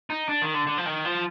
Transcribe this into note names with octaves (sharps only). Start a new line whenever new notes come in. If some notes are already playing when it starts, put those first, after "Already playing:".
D#4
D4
D#3
D3
D3
F3
D#3
F3